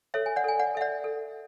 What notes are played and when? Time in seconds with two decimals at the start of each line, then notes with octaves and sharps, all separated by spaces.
0.14 A4 C#5 E5
0.26 G#5
0.36 D5 F#5
0.44 A4 G#5
0.60 D5 F#5
0.75 A4 E5
0.81 D5 F#5
1.04 A4